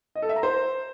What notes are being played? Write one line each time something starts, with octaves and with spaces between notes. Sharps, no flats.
D#5
A4
E5
A#5
C5